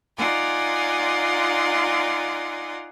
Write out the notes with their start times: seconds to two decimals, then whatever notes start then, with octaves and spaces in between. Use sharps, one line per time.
0.18 D#4 F4 D5 F#5 G#5 C6